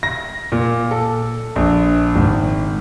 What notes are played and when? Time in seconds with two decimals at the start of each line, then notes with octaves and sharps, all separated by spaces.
0.03 A#6
0.52 A#2
0.91 A4
1.56 A#1
2.16 G#1